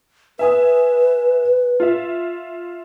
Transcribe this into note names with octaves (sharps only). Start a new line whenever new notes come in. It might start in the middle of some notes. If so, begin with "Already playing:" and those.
B4 E5 G#5 D#6
F4 E5